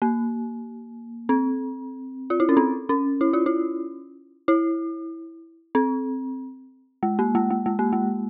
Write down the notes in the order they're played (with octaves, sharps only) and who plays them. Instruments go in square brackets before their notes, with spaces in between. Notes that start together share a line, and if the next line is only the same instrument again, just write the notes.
[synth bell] A#3
C4
F4
E4
C#4
C4
C#4
E4
F4
E4
E4
C4
G#3
A#3
G#3
G#3
G#3
A#3
G#3